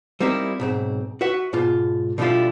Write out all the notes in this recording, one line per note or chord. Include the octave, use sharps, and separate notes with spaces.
G3 A#3 C4 D#4 E4
B1 G#2 C4
F#4 B4 E5 F#5
G#2 B2 F4
B2 D3 F3 G3 E4 F4